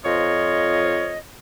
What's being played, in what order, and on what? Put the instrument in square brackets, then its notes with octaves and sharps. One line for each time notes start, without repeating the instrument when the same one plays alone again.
[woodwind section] F2 F4 D#5 [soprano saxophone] C#5